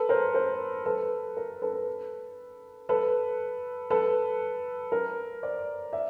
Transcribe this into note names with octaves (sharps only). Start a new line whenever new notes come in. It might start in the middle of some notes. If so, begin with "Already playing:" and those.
Already playing: A4 B4
A#4 C5
A#4 C5
A4 B4
A#4
A4 B4
A4 B4
A4 B4
A#4
C5 D5
D5 E5